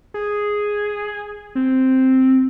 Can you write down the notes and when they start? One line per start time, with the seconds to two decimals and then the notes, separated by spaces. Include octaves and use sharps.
0.14 G#4
1.55 C4